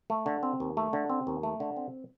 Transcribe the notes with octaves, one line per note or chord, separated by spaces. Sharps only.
A3
D3
C4
D#2
A3
D3
C4
D#2
A3
D3
C4